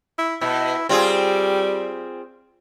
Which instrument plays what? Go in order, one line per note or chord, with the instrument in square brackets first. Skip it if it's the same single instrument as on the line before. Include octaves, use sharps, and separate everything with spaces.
[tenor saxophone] E4
[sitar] B2 [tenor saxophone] E4
[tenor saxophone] G3 [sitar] C4 F4 G#4